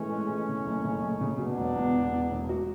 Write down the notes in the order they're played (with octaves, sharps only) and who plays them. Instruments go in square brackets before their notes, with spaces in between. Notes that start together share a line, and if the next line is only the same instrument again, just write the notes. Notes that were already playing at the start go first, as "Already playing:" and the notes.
Already playing: [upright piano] A2 E3 G#3 [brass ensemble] A3 C#4
[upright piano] G#3
E3
C#3
F#1
C#3
F#1
C#3
[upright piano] F#3 [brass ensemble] B3 D4
[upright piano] E1
E2
E2
E2
E1
F#4